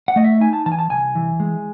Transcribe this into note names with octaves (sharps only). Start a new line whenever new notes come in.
F#5
A3 D#5
E5
D#4 G#5
A5
E3 A5
G#5
A5
C2 G#5
E3
G#3